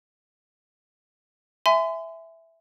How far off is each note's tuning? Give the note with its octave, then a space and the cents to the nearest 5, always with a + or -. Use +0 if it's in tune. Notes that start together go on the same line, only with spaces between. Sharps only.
E5 +0 G#5 +0 C6 -40